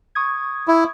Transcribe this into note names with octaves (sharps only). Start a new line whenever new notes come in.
C#6 D#6 G#6
E4